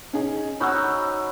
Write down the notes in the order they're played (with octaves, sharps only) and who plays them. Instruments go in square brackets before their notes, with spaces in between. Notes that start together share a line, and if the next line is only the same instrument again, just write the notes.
[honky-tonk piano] C#4 D#4 G#4
[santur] C#4 D#4 F#4 [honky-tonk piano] B5 E6